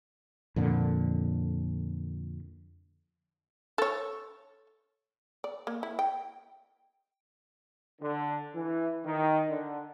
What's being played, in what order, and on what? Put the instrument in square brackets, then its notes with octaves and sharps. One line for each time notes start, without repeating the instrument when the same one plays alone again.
[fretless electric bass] F2 A#2 D3
[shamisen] A4 C#5
D5
A#3
E4
G5
[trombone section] D3
E3
D#3
D3